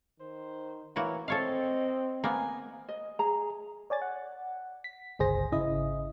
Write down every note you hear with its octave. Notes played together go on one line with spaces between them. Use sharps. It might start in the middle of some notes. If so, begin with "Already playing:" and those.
D#3 C5
E3 A#3 E4 F#4 C#5
C4 A4 C#5 D#5 F5
A#3 B3 G#5
D#5
G#4 A#5
C#5 D5 G#5 A6
F#5
B6
G1 C#2 G#4 C5 A#6
G#1 C#3 E4 D#5